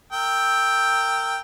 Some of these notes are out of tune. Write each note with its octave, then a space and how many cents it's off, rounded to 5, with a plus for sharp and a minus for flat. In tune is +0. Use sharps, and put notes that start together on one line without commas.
A#4 -25 G5 +5 E6 -15